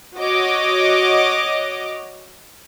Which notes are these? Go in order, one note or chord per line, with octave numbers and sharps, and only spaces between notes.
F#4 C#5 D#5 D6